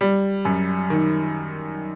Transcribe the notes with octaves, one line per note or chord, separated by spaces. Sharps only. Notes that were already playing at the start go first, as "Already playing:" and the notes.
G3
F#2
D#3